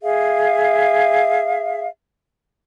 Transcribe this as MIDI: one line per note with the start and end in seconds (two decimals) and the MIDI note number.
0.02 1.87 68
0.02 1.87 76
0.02 1.87 77